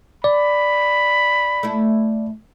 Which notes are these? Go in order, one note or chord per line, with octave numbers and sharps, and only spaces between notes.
D5 B5
A3 E4